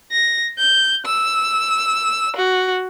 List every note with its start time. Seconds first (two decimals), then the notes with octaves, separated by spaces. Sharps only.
0.12 A#6
0.58 G6
1.06 E6
2.36 F#4